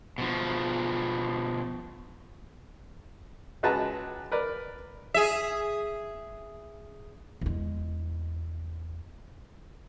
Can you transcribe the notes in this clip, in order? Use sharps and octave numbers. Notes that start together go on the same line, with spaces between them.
B2 F3
C#2 G#3 F#4 B4 A5 A#5
A#4 B4 D5
G#4 E5
E2 G#3